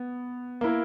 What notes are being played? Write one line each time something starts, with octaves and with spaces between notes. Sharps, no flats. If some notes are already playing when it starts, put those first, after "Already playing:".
Already playing: B3
A#3 E4 A#4